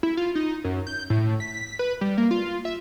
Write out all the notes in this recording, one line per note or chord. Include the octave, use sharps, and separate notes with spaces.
E4
F4
D#4
F#2
G6
A2
B6
B4
G3
A#3
F4
E5